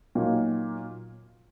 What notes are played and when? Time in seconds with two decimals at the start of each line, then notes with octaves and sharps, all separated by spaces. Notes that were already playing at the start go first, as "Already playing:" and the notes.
0.15 A#2 F#3 A#3 D#4